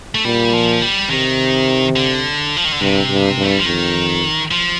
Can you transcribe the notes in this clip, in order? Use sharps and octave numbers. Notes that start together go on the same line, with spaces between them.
A3
A#2 G3
F3
G3
C3 D#3
D3
F3
D#3
D3
G2 C3
G2
G2
A3
G3
F3
F2 D#3
F3